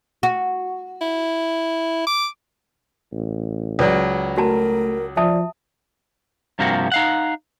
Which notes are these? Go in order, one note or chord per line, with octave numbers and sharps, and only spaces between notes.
F#4
E4
D6
A1
C#2 F#3 E4 B4 D5
A3 F#4 A#4 A5 A#5
F3 D5 E5 A5 D#6
G2 C3 F3 A#3 F#4
D#4 F5 F#5